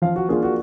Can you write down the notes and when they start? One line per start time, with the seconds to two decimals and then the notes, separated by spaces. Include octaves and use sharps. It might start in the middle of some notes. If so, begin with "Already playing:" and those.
0.02 F3 F5
0.16 F#4
0.29 A#3 D4 F4 G#4
0.43 F#4